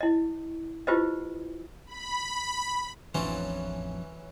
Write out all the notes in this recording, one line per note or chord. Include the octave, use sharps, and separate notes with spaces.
E4 D#5
E4 F4 G4 B4 C5 D#5
B5
A1 F2 E3 F#3 C#4 D4 C5